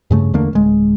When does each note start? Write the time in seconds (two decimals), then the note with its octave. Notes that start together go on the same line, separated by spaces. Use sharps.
0.11 G2 C#3 A3
0.33 E2 D3 A3 A#3
0.53 D1 G#3